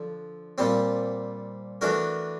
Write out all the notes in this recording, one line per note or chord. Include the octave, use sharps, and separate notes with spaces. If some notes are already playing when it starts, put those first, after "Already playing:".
Already playing: D3 F3
A#2 G3 C4
E3 A3 D4 F#4 A#4